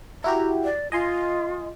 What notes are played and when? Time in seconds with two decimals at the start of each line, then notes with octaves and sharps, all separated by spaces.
0.24 E4 F#4 G4 A#5
0.64 D5
0.92 F4 D#5 G#5 C6